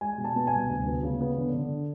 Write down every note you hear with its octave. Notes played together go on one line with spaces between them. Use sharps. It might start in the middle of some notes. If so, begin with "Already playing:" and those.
G#3 G#5
B2
A5
B3
G#5
C2
D2
B3
C#3
B3
D3
D3